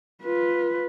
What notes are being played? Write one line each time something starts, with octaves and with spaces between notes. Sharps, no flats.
F4 B4